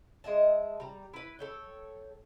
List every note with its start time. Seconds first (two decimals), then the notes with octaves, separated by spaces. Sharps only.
0.24 G#3 D#5 E5 A5
0.80 G3 A#5
1.14 E4 B4
1.39 A4 C#5 G5